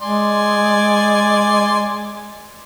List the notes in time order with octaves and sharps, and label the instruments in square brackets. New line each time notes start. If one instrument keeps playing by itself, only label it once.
[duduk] G#3 [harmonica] D5 G#5 C6